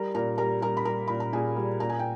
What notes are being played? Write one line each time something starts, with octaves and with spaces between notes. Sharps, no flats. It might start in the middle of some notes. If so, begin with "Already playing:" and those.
Already playing: G3 A#4 A#5
A#2 A#4 A#5
G3 A#4 A#5
G3 A#4 A#5
B5
G3 A#4 A#5
A#2 B5
A#5
A#2 G#4 G#5
G3
A#2 A#5
G#5
G5